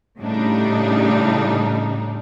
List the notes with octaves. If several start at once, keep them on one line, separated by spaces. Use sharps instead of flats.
A2 C#3 G3 D4 D#4